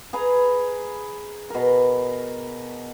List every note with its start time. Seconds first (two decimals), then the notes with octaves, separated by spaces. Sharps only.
0.13 G#4 B4 G#5 A#5
1.50 B2 A#4